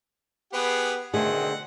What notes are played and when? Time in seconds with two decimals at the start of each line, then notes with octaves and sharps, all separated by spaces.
0.53 B3 G4 G#4 B4 F#5
1.14 B2 D3 D#3 A3 C4 G#4 F#5